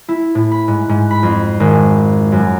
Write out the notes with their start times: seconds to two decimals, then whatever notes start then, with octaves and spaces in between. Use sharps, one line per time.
0.09 E4
0.35 A2
0.51 B5
0.68 G#2
0.89 G#2
1.11 B5
1.23 F2
1.60 G#1
2.32 F#2